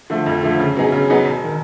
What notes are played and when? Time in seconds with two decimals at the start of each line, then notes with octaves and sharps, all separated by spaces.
0.10 D3 F3 A3
0.26 F2
0.43 D3 F3 A3
0.59 C#3
0.75 F#3 B3 D#4 G#4
0.92 C#3
1.08 F#3 B3 D#4 G#4
1.25 E1
1.44 D#3